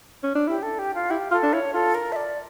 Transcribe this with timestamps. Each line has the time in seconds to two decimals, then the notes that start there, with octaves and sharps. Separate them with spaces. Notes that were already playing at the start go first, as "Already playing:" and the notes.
0.23 C#4
0.35 D4
0.48 E4 G4
0.63 A4
0.79 G4
0.94 F4
1.10 E4 G4
1.31 F4 A4
1.43 D4
1.53 E4 C#5
1.74 F4 A4
1.94 A#4
2.12 E5
2.16 D5